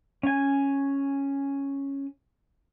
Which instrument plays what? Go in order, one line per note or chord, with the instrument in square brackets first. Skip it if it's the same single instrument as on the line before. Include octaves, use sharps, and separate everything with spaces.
[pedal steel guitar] C#4 G#5